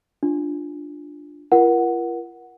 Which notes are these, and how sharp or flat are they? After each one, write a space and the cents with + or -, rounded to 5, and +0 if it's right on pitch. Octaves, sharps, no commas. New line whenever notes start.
D4 +5 F4 +0
F4 -40 A#4 +30 F#5 +0